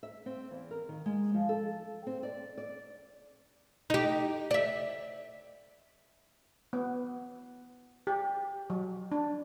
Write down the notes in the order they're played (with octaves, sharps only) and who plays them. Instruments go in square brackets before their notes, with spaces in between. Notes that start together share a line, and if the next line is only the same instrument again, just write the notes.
[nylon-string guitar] E5
C4
E2
A#4
D#3
G#3
F3
A4
C4
D5
D5
[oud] D#4 G4
D5 E5
[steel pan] B3
G4
F#3
D4